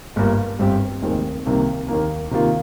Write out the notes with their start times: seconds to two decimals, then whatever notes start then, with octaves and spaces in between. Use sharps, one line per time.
0.16 G1 G2 G3 A#3
0.59 G1 G2 G3 C4 G4
1.02 F1 D#2 D#3 G#3 C4
1.46 C2 C3 D#3 A#3
1.88 D#2 D#3 A#3
2.31 C3 D#3 A#3 F4